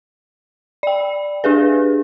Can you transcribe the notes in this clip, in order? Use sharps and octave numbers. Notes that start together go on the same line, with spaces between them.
D5 G5
D4 G4 G#4 B4